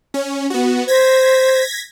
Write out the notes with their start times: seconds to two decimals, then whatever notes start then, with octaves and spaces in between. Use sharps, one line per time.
0.14 C#4
0.50 B3 F#4
0.88 C5 G#6 A#6 B6